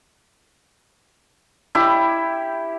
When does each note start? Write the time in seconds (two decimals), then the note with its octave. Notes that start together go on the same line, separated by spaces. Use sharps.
1.75 E4 G4 B5